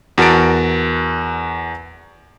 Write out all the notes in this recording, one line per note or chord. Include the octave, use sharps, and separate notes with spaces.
E2 F#4 A#4 A5 A6 D7